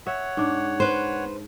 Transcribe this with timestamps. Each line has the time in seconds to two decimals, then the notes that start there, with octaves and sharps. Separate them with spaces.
0.07 C#5 E5 F#5
0.37 G#2 D4
0.80 B4 C5